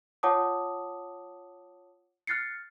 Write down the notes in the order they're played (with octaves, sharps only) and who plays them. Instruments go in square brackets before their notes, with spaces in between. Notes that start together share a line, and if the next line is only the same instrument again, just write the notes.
[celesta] F4 C#5 F#5 A5 D6 D#6
F6 F#6 A6 C7 C#7